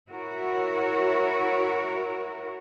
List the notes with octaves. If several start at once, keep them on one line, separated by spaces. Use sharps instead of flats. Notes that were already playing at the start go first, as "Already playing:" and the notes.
E4 F#4 A#4 C#5